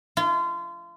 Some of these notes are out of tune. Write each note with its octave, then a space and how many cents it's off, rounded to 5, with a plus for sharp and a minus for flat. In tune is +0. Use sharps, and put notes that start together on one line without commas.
F4 -30